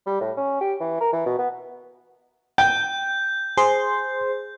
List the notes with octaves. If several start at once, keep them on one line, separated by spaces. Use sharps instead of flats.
G3
A2
C#4
G4
E3
A#4
E3
B2
B3
G5 G6
G#4 C5 C6